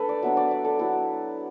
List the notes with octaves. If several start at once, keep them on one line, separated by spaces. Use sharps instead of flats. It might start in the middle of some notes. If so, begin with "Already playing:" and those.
Already playing: A3 D4 A4 B4
D5
F#3 B3 D4 E5
D5
D5
A4
F#3 B3 E4 A4